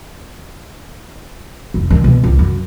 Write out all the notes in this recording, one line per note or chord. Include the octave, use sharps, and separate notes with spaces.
F1
D#3
B2
C#2
F#2